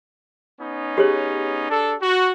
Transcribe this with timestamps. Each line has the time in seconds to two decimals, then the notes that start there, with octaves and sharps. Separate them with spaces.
0.60 B3 C#4 D#4
0.98 G4 G#4 C#5
1.68 D4 A4
2.01 F#4